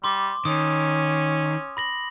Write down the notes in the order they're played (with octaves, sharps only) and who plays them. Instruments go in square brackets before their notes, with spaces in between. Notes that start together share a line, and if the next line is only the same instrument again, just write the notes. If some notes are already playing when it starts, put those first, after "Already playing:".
[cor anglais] G3 [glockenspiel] C6 D6
[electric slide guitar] D#3 [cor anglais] C#4 [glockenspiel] D#6
[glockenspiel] B5 A#6 F#7